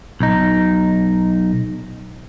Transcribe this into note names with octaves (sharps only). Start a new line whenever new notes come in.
B1 D#4